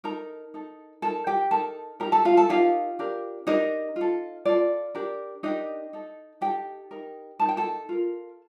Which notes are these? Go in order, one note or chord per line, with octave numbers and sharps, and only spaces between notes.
D#4 A4 A#4 A#5
D#4 A4
D#4 A4 A#4 A5
G4 G5
D#4 A4 A#4 A5
D#4 G4 A#4 A#5
A4 A5
F4 F5
A4 A5
D#4 F4 G4 A#4 F5
D4 G4 A#4
D4 D#4 G4 A#4 D#5
F4
A4
F4 A4 D5
D4 G4 A#4
D4 D#4 G4 A#4 D#5
D#4 A4
D#4 G4 A4 G5
D#4 A#4
D#4 A#4 A5
G5
A4 A5
F4 A#4